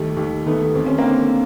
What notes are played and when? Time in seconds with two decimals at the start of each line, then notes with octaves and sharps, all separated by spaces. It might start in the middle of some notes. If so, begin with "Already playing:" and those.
Already playing: D#2 D#3 G3 A3
0.17 D#2
0.46 D#3 A3 B3
0.75 D#2 C4
0.86 C#4
0.98 A#3 C4
1.04 D3